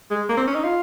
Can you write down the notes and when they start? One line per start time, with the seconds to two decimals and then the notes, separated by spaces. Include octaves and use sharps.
0.11 G#3
0.29 A#3
0.37 C4
0.47 C#4
0.55 D#4
0.64 F4